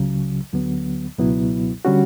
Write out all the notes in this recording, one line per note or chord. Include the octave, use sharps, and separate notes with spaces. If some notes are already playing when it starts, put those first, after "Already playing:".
Already playing: C#2 C#3 F#3
D2 D3 F#3 B3
C#2 B2 F#3 B3 E4
D3 G3 C#4 F#4